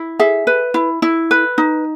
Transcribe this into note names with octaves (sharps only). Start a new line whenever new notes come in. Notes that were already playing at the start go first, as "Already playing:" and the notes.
Already playing: E4
G#4 E5
B4
E4
E4
B4
D#4